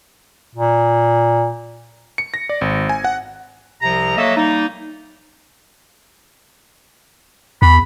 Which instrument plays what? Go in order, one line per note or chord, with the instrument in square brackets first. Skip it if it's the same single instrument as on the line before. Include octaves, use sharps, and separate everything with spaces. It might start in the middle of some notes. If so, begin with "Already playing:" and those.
[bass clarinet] A#2
[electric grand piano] C#7
A#6
D5
G#1
G#5
F#5
[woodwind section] C2 C3 F3 A#5
F#3 A#3 A4 D#5 E5
G3 A#3 D#4
[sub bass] E2 [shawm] B5